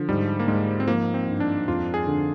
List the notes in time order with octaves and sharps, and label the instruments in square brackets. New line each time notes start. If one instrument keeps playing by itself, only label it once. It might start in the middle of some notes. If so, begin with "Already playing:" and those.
Already playing: [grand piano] D3 [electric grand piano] F3
[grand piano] G#2 [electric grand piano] G3
[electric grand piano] A#3
[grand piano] G#2 [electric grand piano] G#3
[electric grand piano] C4
[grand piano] F3 [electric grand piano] A#3
[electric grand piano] C4
[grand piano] G2
[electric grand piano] D4
[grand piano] F2 [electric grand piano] F4
[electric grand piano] G#4
[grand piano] D3